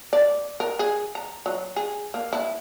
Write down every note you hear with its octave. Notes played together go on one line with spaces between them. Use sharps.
D5
A#4
G#4
A#5
F#3
G#4
A#3
E4